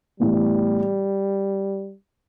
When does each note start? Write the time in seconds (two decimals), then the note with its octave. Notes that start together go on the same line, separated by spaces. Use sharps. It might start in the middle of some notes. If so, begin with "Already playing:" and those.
0.20 A2 E3 G3 B3